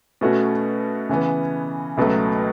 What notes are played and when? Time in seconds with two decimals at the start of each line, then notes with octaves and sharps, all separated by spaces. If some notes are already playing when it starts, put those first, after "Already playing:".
0.21 B2 A3 C#4 F#4
1.09 C#3 E3 B3
1.97 C#2 B2 F#3 A3